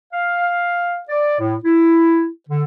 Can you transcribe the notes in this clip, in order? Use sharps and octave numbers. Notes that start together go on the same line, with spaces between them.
F5
D5
A2
E4
D3